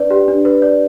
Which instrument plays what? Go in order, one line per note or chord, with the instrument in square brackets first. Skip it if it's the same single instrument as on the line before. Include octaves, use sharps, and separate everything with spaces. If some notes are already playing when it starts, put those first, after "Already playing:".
Already playing: [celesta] D4 B4 D5
G4
D4
B4
D5